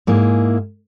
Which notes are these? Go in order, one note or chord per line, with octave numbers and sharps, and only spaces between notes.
G#2 A#3 E4 G#4